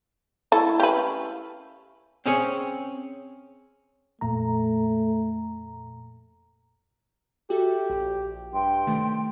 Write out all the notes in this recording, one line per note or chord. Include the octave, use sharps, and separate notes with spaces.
A3 E4 A4
C#4 G4 B4 F5
C4 C#4 G#4 C#5
F2 A#2 A3 A#5
F#4 G4 A4 E5
A#1
G2 G5 C6
C3 D#3 A3